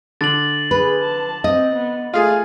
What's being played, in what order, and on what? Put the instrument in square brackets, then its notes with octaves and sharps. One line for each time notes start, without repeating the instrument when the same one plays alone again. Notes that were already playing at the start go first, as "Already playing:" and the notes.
[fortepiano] D3 [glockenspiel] A6 F#7
[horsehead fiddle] G#4 [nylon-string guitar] B4
[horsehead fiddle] A5
[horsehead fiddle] C4 [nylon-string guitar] D#5
[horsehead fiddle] B3
[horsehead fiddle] A3 G#5 [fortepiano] F4 G#4